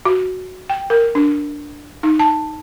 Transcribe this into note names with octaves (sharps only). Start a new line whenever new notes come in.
F#4
G5
A#4
D4
D#4
A5